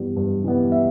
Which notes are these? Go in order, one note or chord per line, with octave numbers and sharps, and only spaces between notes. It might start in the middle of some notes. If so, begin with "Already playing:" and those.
Already playing: G2 E3 G3 B3
G2
E3 G3 B3
E5